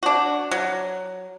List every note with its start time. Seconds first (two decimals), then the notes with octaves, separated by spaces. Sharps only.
0.03 D4 F#4
0.51 F#3